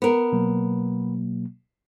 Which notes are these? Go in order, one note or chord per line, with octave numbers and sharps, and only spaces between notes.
B3 A#4
B2 F#3 A#3